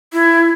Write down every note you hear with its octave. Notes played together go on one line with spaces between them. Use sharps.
E4